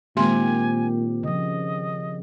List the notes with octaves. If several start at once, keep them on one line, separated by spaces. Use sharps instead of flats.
A#2 D#3 G#3 A#3 C4 G4 G#5 C6
C#3 F3 D#5